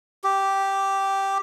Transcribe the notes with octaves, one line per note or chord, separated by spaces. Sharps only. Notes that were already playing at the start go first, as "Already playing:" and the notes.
G4